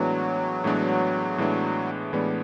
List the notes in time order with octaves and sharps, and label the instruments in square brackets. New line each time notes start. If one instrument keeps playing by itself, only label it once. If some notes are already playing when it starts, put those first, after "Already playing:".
Already playing: [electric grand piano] A2 E3 G#3 B3 D4 [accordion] F#3
[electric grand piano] A2 E3 G#3 B3 D4
A2 E3 G#3 B3 D4
[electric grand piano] A2 E3 G#3 B3 D4 [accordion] G3